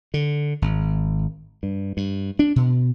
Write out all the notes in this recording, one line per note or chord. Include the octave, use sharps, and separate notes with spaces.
D3
G#1
G2
G2
D4
B2